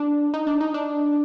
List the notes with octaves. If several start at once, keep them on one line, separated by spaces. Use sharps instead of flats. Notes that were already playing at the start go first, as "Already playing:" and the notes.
Already playing: D4
D#4
D4
D#4
D4